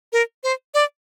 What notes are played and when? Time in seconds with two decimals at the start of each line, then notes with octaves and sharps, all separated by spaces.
0.13 A#4
0.44 C5
0.74 D5